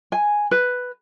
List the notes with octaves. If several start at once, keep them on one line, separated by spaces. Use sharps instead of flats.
G#5
B4